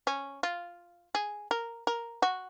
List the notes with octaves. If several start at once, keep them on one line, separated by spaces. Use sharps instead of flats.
C#4
F4
G#4
A#4
A#4
F#4